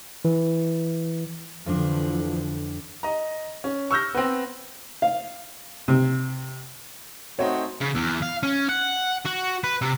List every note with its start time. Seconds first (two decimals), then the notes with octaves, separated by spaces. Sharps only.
0.25 E3
1.66 F2 D3 E3 F3 D4
3.03 D#5 A#5
3.64 C#4
3.91 C#6 E6 F6 G6 A#6
4.14 B3 C4
5.02 F5
5.88 C3
7.39 A3 C4 D#4 F#4 C#5
7.81 C#3
7.95 E2
8.22 F5
8.43 C#4
8.69 F#5
9.25 F#4
9.64 B4
9.82 C3